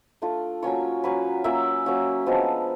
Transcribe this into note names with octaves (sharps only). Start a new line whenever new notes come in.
A3 D4 F4
F#3 A#3 C#4 F4 C#5
F#3 A#3 C#4 F4 B4
F#3 A#3 C#4 F4 E5
F#3 A#3 C#4 F4
F3 G#3 B3 D4